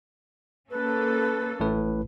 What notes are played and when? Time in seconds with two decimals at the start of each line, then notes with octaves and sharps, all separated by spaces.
0.70 A#3 C#4 A4 B4
1.60 A1 A2 B4